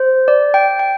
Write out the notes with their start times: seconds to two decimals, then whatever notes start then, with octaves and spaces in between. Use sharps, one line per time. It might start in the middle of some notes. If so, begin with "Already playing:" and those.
Already playing: C5
0.28 D5
0.54 G5
0.79 G5